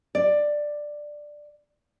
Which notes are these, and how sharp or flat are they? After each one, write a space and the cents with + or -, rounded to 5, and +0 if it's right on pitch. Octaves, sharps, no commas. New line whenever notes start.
D5 +10